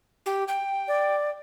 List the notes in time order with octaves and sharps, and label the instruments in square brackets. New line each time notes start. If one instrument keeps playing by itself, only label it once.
[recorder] G4
G5
[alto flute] D5